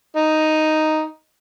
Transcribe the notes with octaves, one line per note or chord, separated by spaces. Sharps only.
D#4